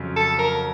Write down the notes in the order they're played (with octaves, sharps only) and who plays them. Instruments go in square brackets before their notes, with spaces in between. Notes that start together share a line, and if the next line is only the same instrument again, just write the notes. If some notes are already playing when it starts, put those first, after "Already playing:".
Already playing: [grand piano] F2 C#3 F#3
[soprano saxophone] A4
A#4